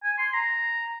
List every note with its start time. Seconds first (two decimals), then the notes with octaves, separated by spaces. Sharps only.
0.03 G#5
0.18 C6
0.34 A#5